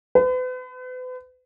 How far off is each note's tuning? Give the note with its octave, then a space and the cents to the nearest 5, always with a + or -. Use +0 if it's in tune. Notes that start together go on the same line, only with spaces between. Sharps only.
B4 +40